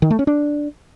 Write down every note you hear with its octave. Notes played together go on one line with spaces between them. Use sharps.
D#3
A3
C#4
D4